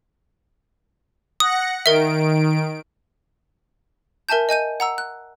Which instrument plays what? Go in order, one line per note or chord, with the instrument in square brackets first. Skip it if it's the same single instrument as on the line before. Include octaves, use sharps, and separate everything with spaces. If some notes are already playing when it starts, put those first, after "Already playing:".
[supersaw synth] F#5 A#6 C#7 [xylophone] D#6
[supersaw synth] D#3 D7 [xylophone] A#4 E5
[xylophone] A#4 E5 G#5 A5 G6
D#5 G#5 G6 D#7
F#5 A#5 E6
F#6